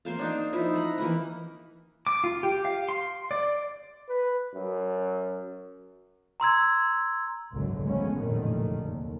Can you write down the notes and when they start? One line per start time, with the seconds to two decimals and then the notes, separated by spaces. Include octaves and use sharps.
0.05 A#3 C5 F5
0.19 D4 D#4 F5
0.53 F3 D#4 E4
0.74 F#5 A#5 B5
0.98 E3 A#3 F#5 B5
2.07 D6
2.24 F4
2.43 G4
2.65 F5
2.89 C6
3.31 D5
4.09 B4
4.54 F#2
6.40 A#5 C6 E6 G#6
7.52 G#1 C#2 F#2 B2 D3 F#3
7.84 E3 F3 G#3 A3 B3 C#4
8.19 F1 A#1 F#2 A2 D3 D#3
8.87 D#2